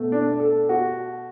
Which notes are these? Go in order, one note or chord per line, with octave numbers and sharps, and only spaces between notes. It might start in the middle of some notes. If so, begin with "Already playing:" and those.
Already playing: B2 A3
D4
A4
F#4